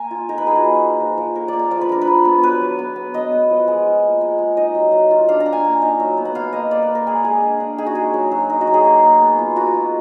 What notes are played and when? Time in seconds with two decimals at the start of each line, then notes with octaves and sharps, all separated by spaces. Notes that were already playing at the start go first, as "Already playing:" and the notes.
Already playing: A#3 G#5 A#5
0.11 F4
0.29 D#4 A#4
0.38 B4
0.47 D#4 G#4
0.55 F#4
0.64 A#3
0.83 A#3
1.00 F3
1.18 F3
1.35 A#3 A#4
1.48 A#3 D5
1.59 F5
1.71 F3 D5
1.81 B4
1.89 D4 A#4
2.01 B4
2.07 F4
2.25 B3
2.43 F#3 B4
2.61 F#3
2.79 B3
2.96 B3
3.14 B3 D#5
3.32 B3
3.50 F3
3.68 G#3
3.86 F4
4.03 A#3
4.21 G#3
4.39 G#3
4.57 D#4 D#5
4.75 F#3
4.92 F#3
5.11 F4
5.29 D4 F5
5.40 A#5
5.46 D4
5.53 G#5
5.65 A#3
5.82 D#4
6.00 F#3
6.17 B3
6.25 F#5
6.35 A#3 F5
6.53 A#3 D#5
6.71 A#3 D5
6.82 B4
6.89 A#3
6.95 A#4
7.07 G#3 G#4
7.24 G#3 G#4
7.42 D4
7.60 D4
7.78 D#4 G#4
7.86 F#4
7.95 G#3 G#4
8.14 F#3
8.31 F#3
8.50 D#4
8.61 F#4
8.67 F#3
8.74 G#4
8.85 A#3
9.02 A#3
9.21 B3
9.39 F4
9.56 F4 F#4
9.74 G#3